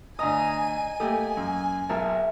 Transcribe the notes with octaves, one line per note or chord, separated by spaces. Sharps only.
D2 D#5 G#5 A#5 D#6 D#7
A3 A#3 G4 G#5 D#6
F#2
B1 G#4 A#4 E5 A5